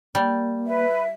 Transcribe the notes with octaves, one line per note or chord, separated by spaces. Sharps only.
G3 A#3
B4 E5